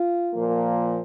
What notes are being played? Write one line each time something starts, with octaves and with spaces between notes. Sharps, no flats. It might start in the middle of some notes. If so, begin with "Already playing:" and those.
Already playing: F4
A#2 F3 A#3